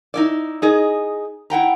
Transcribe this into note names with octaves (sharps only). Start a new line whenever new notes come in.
D#4 E4 D5
D#4 G#4 D#5
E4 F#5 G5 A#5